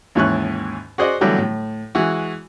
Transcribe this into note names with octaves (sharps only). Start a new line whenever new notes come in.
D#2 G#2 E3 C#4 C#6 F#6
F#4 G#4 C5 D5 D#5 F#5
D3 E3 F#3 G3 A3 B3
A2
E3 G#3 F#4